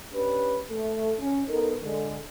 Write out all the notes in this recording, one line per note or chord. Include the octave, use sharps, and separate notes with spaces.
C#4 D4 G4 B4
A3
C#4
B3 D#4 A4 A#4
D3 G#3